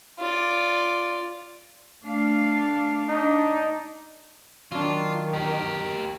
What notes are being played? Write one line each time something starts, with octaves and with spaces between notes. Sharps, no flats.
F4 D5
A3 D4 F5
D4 D#4
D#3 F#3 D4 F4
G4 A#4